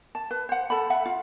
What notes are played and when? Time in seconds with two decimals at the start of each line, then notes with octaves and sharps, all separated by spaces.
0.15 A5
0.31 B4
0.49 C5 F#5
0.70 A4 A5 B5
0.90 E5 F#5
1.06 F4